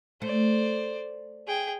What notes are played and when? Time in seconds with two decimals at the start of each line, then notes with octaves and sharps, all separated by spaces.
0.22 A3 C5 D5
1.47 G#4 G5